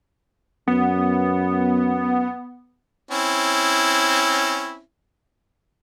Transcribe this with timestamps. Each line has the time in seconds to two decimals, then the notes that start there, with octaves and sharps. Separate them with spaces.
0.68 F#2 B3
3.11 C4 C#4 E4